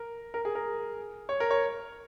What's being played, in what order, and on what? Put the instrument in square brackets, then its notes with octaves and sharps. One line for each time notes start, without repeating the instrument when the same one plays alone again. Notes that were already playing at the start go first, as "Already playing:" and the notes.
Already playing: [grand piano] A#4
A#4
G#4
A#4
C#5
A#4
C#5